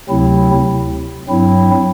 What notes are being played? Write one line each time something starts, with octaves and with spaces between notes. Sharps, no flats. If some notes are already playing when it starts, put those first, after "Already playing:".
D2 C3 F#3 C4 E4
G2 F#3 C4 E4